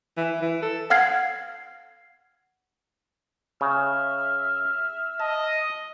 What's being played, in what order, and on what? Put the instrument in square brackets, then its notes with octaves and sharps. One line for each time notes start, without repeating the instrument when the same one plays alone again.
[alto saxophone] E3
E3
A4
[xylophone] F5 F#5 F6 G#6 C7
[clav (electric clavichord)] C#3 [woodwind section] E5 F6
[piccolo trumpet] D#5 [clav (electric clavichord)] A5